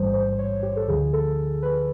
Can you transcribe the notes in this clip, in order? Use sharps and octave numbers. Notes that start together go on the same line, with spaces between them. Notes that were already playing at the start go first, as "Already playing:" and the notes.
Already playing: A1 G#2 E3 G3 C5
C5
C5
C#5
G4
A4
D2 D3 F3 G#4
A4
B4